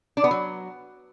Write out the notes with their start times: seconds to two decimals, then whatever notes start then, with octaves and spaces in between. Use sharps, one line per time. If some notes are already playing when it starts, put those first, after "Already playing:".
0.17 D4
0.24 B3
0.31 F#3